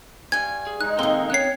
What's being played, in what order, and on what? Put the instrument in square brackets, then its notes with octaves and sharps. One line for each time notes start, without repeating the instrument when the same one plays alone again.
[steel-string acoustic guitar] G2 G#5 [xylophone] G#6
[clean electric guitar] G#4
[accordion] G#3 D#4 [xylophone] F#6
[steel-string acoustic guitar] D#3 A#3 [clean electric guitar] C4 A4 C6
[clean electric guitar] C4 C#4 C#5 [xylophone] F#6 C7